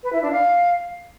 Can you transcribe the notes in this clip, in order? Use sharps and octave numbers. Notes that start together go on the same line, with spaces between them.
B4
E4
D4
F5